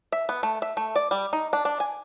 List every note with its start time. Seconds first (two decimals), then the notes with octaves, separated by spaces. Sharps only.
0.12 E5
0.29 B3
0.43 A3
0.62 E5
0.77 A3
0.96 D5
1.11 G3
1.33 D#4
1.53 D4
1.65 D4
1.80 G#5